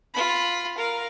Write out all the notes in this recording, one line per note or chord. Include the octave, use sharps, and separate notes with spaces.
F4 B5
A#4 F5